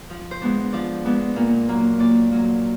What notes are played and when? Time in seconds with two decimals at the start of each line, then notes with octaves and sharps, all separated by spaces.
0.10 F3
0.31 C5
0.41 G#3 B3 D4
0.72 F3 D5
1.05 G#3 B3 D4
1.36 A#2
1.68 F#3 A#3
2.00 A#2 D5
2.31 F#3 A#3